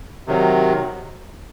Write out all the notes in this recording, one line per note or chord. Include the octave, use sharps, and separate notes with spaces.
C3 D#3 F#3